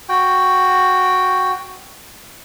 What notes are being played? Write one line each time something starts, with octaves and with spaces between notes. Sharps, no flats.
F#4 G5